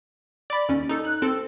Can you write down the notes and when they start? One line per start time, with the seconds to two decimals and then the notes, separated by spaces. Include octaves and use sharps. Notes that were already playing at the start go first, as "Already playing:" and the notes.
0.50 D5 B5
0.69 D#2 C#4
0.89 D#4 A4
1.05 F#6
1.22 C4 A4